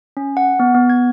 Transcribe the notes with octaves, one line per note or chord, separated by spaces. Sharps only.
C#4
F#5
B3
B3
G#6